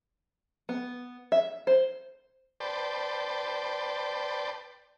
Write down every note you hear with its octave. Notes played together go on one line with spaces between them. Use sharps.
B3
E5
C5
B4 C5 D5 G5 A5